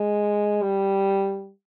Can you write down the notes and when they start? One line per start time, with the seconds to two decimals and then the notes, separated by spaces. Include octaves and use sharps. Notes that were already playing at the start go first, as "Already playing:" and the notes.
Already playing: G#3
0.62 G3